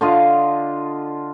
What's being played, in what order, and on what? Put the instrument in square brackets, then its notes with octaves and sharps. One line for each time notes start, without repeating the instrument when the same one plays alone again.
[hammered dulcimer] D3 F4 D#5 F5